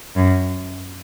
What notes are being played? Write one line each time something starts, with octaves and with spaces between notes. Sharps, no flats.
F#2